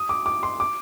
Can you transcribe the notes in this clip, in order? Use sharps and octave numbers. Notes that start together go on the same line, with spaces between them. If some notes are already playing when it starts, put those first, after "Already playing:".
Already playing: D#6
D6
D6
C6
D6